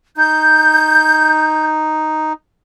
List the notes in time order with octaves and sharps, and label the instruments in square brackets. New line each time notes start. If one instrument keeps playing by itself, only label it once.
[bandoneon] D#4 [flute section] G6